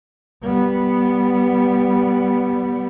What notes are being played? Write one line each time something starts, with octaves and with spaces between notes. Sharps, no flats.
G3 B3